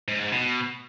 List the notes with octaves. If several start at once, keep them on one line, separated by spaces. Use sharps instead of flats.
G#2
G#2
B2